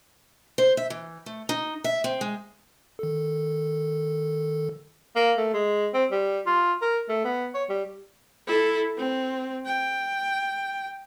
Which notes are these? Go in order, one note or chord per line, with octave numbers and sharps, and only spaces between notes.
C5
E5
E3
A3
D#4
E5
C4
G#3
D#3 A4
A#3
A3
G#3
C4
G3
F4
A#4
A3
B3
C#5
G3
E4 A4
C4
G5